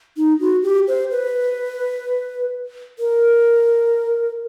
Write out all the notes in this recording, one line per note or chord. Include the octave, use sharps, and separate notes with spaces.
D#4
F#4
G4
C5
B4
A#4